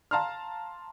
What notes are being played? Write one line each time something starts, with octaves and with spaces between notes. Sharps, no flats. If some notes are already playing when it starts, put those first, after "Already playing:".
F5 A5 A#5 C6 F6